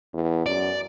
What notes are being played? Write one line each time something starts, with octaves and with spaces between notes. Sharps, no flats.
E2
F#2 D5